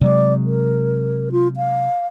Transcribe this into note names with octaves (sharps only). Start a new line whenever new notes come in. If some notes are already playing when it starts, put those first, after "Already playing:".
C3 F#3 G#3 D5
A#4
F4
F5